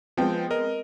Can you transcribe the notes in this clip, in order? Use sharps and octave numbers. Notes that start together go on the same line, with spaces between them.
F3 G#3 B3 C4 G5
A#4 D#5